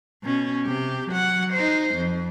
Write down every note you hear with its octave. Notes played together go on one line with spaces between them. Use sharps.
B2 C#4
C3 G4
F#3 F#5
D#4 C5
F2